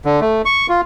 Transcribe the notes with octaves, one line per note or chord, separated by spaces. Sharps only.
D3
A3
C#6
F4